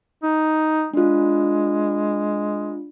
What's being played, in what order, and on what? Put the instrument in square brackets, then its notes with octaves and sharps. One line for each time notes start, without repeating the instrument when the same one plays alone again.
[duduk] D#4
[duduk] G#3 [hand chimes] D4 F4